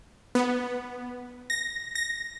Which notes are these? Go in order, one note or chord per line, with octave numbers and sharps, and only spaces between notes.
B3
A#6
A#6